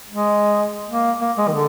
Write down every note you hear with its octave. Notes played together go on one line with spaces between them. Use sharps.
G#3
A#3
A#3
G#3
D#3
D3